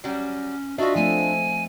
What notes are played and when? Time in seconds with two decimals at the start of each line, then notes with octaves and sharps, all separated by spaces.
0.04 F#3 G3 C#4
0.78 D4 F4 F#4 D#5 E5
0.96 F3 A3 C4 G#5